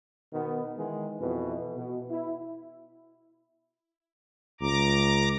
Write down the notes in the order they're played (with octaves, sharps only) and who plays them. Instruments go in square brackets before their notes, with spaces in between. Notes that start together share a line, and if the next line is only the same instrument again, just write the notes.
[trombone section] B2 D#3 B3
D#3 E3 G#3
F2 B2 E3
B2
E4
[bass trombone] C#2 [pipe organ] A#5 D6